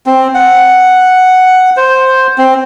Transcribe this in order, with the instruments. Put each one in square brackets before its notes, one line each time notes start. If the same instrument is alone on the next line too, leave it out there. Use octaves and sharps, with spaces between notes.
[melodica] C4
F#5
C5
C4